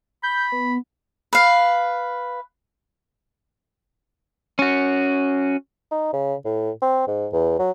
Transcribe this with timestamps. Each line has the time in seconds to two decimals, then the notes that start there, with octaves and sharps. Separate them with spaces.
0.23 B5 G6
0.52 B3
1.33 B4 F5
4.59 C#4 F#4
5.91 D#4
6.13 C#3
6.45 A2
6.82 C4
7.07 G#2
7.33 E2
7.59 F#3